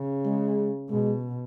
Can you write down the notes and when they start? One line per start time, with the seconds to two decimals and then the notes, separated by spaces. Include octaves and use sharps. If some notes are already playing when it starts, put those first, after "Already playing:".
Already playing: C#3
0.25 G#3
0.89 B2 G#3